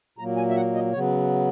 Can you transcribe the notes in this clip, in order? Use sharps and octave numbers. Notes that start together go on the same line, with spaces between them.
A#2 F#3 A#3 A#5
G#5
E5
F#5
D#5
C#3 F#3 B3 C#5